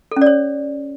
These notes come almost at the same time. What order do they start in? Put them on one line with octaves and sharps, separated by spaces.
A4 C#4 D5 C#5